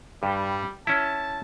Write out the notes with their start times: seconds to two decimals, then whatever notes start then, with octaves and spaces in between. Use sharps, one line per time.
0.23 G2 G3
0.87 C#4 E4 A5